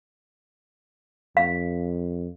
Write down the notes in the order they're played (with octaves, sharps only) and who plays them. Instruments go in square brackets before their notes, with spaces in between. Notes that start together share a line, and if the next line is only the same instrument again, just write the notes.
[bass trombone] F2 [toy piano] F5